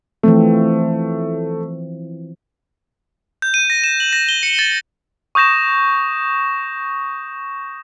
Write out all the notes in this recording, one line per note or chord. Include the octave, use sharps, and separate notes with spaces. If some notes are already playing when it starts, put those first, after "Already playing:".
E3 F3 A3 C4
G6
D#7
A#6
E7
F#7
A#6
G7
C#7
A6
C#6 D#6 G6 A#6 E7